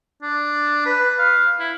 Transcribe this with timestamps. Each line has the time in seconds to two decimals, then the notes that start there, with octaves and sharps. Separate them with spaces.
0.23 D4
0.86 B4
1.19 F5
1.60 E4